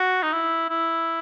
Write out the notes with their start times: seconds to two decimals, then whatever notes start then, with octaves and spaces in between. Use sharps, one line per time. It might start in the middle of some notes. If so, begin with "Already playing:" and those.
Already playing: F#4
0.23 D#4
0.33 E4
0.70 E4